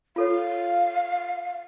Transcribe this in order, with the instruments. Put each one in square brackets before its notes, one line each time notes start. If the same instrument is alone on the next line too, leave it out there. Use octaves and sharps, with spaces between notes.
[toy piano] F4 A4 C#5 [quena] F5